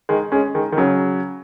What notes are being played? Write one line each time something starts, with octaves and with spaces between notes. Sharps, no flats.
D#3 G#3
G#3 C#4
D#3 G#3
D#3
C#3 F#3